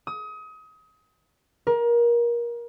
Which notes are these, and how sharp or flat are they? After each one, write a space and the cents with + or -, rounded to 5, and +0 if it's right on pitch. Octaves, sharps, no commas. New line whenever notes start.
D#6 +30
A#4 +25